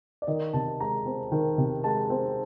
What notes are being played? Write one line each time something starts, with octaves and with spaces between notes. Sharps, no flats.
D5
D#3 D#5
C3 A5
G#3 A#5
C4
D#3
C3
G#3 A5
C4